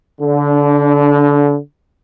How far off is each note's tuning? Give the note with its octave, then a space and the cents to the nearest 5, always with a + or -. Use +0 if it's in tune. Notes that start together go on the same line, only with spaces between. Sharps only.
D3 -25 D4 +10